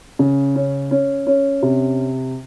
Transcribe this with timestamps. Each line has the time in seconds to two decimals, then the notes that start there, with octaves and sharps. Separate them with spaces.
0.19 C#3
0.55 C#4
0.91 C#4
1.27 C#4
1.63 C3